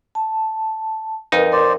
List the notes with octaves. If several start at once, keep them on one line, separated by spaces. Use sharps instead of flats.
A5
F2 D#4 A#4 B4
A#4 C5 D5